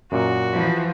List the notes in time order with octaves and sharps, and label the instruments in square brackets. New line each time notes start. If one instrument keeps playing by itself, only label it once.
[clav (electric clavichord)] F#2 A#2 [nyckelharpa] F#4
[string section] E3 F3